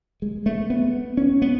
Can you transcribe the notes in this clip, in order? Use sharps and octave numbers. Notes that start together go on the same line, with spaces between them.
G#3
A3
B3
C#4
B3